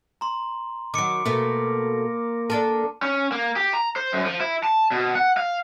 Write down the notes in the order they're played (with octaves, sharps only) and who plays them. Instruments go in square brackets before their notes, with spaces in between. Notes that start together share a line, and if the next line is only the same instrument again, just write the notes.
[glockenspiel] A#5 C6
[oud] D#3 F#3 [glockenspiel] D6 C#7 D7
[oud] B2 A3 [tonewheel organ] A#3
[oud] D4 A4 A#4 [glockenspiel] A5
[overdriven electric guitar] C#4
A#3
G4
A#5
C5
F#2
F3
E4
A5
B2
F#5
F5